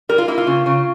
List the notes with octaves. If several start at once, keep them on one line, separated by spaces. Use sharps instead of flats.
G3 A#4
F4
A#3 E4
F4
C#3
C#3